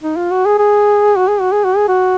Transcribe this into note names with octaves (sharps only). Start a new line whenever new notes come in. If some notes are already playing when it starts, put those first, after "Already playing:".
D#4
F4
F#4
G#4
G#4
F#4
G#4
F#4
G#4
F#4
G#4
F#4